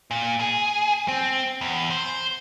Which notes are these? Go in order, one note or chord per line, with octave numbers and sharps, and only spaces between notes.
A#2
G#4
C4
E2
C5